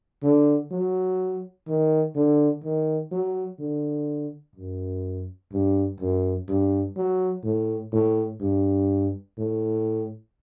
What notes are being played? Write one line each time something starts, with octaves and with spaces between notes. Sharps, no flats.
D3
F#3
D#3
D3
D#3
F#3
D3
F#2
G2
F#2
G2
F#3
A2
A2
G2
A2